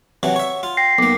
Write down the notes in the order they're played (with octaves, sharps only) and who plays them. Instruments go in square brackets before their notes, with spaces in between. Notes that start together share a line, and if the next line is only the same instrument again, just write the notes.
[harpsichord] C3 E3 F#3 [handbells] F#5
[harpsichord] C#5 E5
F4
[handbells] G5 A#6 C7
[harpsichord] B1 A#3 [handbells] D6